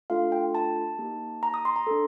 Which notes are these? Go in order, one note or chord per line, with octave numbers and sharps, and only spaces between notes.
A3 D4 F4 A4 F5
G5
A5
A#3 D#4 G4
A#5
D#6
C6
A#5
D4 A4